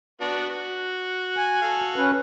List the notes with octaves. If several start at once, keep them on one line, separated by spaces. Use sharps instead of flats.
B3 D4 F#4
F#4
G#5
F#4 A4 F5
C#4 B4